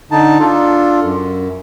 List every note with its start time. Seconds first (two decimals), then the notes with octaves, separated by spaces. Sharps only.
0.11 D3 D#4 A5
0.39 D4 F4 A4
1.03 F#2